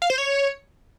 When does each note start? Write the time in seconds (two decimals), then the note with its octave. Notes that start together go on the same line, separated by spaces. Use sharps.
0.02 F5
0.10 C5
0.18 C#5